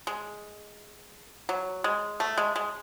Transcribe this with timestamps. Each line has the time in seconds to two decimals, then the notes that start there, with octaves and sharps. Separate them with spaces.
0.07 G#3
1.49 F#3
1.84 G#3
2.20 A3
2.38 G#3
2.56 G#3